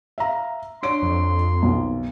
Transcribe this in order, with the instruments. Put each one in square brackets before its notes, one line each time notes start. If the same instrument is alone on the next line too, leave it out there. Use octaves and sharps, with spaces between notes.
[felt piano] E5 F5 A#5
[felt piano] D4 C#5 D7 [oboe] C6
[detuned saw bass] F2
[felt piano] B1 D#3